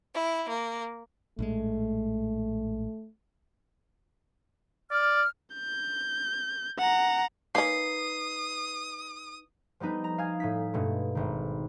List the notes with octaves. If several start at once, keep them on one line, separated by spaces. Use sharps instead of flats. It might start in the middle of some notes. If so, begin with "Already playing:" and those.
E4
A#3
A#1 A2 G#3 A3
D5 F6
G6
F#5 A#5
A#3 C#4 D#4 B4 D#6 C7
F3 G3 B3 D#4 B4
A#5
F5 G#5 D#6 G#6
A2 D#4 B6
G2 B2 G#3 A3
G#1 D#3